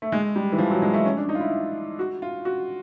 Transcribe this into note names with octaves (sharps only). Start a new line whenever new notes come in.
A3
G#3
G3
E3
F3
F#3
G#3
A3
C#4
D4
D#4
F4
E4
F#4
F4
F#4